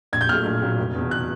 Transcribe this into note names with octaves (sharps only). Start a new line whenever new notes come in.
A#1 G#6
G6
A#2 F#3 A3 F6
A#1
A#2 F#3 A3
F1
E2 B2
F#6